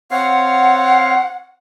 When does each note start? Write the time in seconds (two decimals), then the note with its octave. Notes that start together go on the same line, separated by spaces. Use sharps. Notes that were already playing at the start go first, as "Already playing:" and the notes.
0.11 C4 C#5 F5 F#5